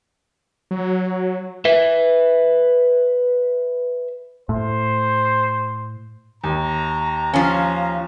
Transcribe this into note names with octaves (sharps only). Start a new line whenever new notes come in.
F#3
B4 E5
A2 C5
D#2 A#5
F3 C#4 F5